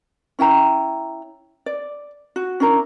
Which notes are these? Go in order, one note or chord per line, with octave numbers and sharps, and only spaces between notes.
C#4 E4 G5 A#5
D5
F#4
C#4 D4 E4 A#4